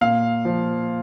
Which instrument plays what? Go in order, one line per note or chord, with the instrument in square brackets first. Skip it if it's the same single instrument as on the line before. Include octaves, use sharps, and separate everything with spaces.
[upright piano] A#2 F5
F3